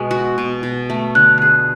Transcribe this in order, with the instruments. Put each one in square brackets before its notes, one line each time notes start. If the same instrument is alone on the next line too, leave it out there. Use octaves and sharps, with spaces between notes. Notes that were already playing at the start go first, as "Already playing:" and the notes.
Already playing: [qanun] B2 G#3
F#4
B2
B2
A3
[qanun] D3 [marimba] F#6
[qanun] G#4 [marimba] F#6